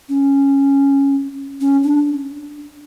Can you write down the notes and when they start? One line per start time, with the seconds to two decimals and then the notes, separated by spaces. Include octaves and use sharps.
0.09 C#4
1.61 C#4
1.83 D4